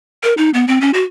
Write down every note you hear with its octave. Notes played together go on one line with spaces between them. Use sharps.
A#4
D#4
B3
C4
C#4
F#4